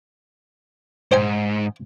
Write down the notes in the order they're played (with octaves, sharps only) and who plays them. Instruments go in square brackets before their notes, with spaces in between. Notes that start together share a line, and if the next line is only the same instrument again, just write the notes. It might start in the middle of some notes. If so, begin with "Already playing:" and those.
[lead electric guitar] G#2 [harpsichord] C5 G5 G#5